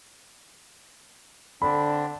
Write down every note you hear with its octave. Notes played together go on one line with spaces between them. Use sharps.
D3 C4 D4 B5